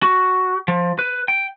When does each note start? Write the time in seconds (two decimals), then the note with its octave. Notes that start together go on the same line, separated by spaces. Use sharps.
0.03 F#4
0.68 F3
0.99 B4
1.28 G5